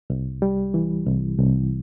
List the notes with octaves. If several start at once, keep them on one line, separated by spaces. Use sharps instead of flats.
C2
G3
E3
C2
C2